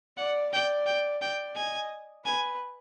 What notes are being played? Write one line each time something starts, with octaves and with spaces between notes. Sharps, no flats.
D5 F#5
D5 G5
G5
D5 G5
D#5 G#5
B4 G#5